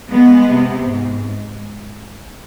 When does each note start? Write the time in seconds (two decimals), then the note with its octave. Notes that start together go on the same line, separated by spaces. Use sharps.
0.10 G#3 B3
0.49 C3
0.88 G#2